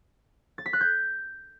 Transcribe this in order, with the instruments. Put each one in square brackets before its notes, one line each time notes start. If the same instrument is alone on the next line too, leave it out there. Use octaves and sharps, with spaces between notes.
[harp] A6
B6
F#6
G6